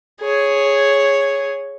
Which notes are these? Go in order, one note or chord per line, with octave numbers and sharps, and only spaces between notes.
G#4 C#5